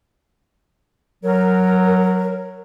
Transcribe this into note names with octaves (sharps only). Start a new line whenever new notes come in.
F#3 A#4